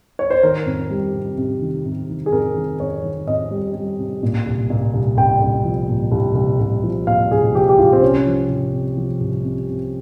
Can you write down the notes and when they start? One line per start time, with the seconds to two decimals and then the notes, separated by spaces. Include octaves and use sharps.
0.19 C#5
0.30 C5
0.43 D#3 A#4
0.66 F2
0.90 G3
1.14 C3
1.38 C3
1.61 D#3
1.86 C3
2.09 D#3
2.26 G#4
2.32 F2 A#4
2.56 D#3
2.80 F2 C#5
3.04 D#3
3.28 F2 D#5
3.51 G3
3.75 G3
3.99 C3
4.23 A#2
4.46 C2
4.70 A#2
4.94 C2
5.17 C2 G5
5.42 C2
5.65 F3
5.88 A#2
6.12 C2
6.35 C2
6.59 C2
6.83 F3
7.07 A#2 F5
7.31 C2 G#4
7.54 F3 G4
7.69 G4
7.78 C2 F4
7.93 C4
8.02 C2 C#4
8.26 F3
8.49 C2
8.73 C3
8.97 F3
9.20 C2
9.44 C3
9.69 C3